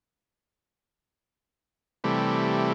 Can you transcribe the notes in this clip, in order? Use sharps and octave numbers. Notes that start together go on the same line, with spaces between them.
C3 E3 G3 A3